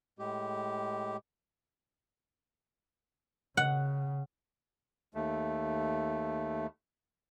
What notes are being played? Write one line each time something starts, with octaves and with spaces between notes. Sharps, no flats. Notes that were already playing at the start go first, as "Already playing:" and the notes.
A2 G#3 G4
C#3 F#5
D#2 A3